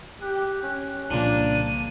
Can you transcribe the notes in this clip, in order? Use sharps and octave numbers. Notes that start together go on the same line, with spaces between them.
G4 F#6
C#4
C2 A#2 C#3 F3 A#3 D4 D#7